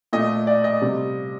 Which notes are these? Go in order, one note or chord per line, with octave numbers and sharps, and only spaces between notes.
A#2 A3 D#5
D5
D#5
C3 G3